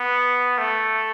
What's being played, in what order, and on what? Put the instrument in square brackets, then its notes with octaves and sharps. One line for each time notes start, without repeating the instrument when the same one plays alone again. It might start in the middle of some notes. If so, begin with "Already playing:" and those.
Already playing: [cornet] B3
A3